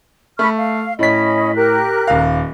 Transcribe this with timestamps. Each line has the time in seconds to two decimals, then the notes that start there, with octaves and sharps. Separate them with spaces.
0.39 A3 B5 C#6 F6
0.55 F5
0.99 A2 C#4 D#5 B5 B6
1.55 G4 A#4 F#6
2.07 D#1 F5